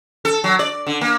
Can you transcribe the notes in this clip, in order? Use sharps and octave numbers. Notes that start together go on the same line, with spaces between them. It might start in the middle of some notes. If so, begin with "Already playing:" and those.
A4
F#3
D5
D3
A#3